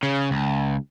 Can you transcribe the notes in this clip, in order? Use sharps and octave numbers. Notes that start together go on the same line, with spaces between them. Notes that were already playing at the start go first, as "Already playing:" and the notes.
C#3
C#2